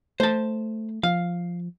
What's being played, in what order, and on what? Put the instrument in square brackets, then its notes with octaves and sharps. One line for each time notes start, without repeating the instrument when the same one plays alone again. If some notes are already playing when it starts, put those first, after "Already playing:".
[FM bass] A3 [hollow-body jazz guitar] C5 A5
[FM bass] F3 [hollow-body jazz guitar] F5